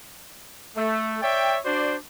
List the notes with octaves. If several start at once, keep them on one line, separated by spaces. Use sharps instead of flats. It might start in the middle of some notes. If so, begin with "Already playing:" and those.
A3
C#5 D5 E5 G5
D4 F#4 C5 D5